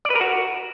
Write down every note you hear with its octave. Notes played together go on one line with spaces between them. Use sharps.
D5
B4
A#4
F#4